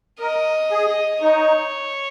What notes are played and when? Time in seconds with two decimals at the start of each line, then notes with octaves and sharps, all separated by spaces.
0.19 A#4 D#5
0.70 G#4
1.22 D#4 C#5